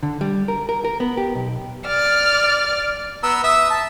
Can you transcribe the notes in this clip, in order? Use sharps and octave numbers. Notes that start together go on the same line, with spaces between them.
D3
G3
A#4
A#4
A#4
B3
G4
B1
D5 F6
B3 A#5 E6
E5 D#6 E6
A5